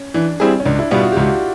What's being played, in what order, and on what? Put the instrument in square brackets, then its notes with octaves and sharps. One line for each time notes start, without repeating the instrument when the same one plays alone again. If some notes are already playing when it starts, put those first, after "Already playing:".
Already playing: [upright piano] C#4
[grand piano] E3 [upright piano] D4
[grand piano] G3 C4 E4 G#4
[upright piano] C#4
[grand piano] C#2 [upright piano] D4
[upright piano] E4
[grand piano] B2 G3 B3 [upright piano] F4
[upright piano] F#4
G4
[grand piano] C#2 [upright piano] F#4